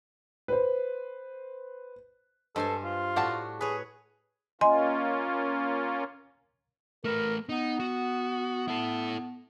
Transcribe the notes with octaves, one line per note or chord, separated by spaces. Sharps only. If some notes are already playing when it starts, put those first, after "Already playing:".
B4 C5
G2 G#3 A4 C5 G#5
F4
A2 D4 F#4 F#5 A5
G#4 B4 C#5
A#3 C#4 F4 D#5 G#5 C6
A3 A#4 B4
B3 D#4
F#4
E4 A4